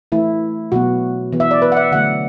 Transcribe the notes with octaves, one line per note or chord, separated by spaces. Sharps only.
E3 A3 E4
B2 F#3 B3 F#4
E3 B3
E5
D5
B4
F#5
E5
D3 F#3 A3 F#5